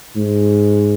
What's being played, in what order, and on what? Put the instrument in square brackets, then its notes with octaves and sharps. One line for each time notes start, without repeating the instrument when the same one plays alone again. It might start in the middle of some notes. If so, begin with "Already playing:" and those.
[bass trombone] G#2